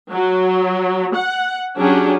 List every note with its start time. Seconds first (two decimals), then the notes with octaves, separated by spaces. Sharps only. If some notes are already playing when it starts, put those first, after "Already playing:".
0.11 F#3
1.14 F#5
1.77 F#3 C#4 D4 G4 G#4